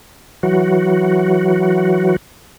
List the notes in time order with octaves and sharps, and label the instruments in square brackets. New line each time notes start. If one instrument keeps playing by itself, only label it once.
[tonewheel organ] E3 F#3 F#4